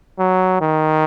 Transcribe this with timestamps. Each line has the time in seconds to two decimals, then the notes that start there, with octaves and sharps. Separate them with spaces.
0.19 F#3
0.61 D#3